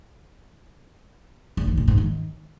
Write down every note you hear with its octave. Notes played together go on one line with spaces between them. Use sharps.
E2
D#3
A#2
G#2
D#3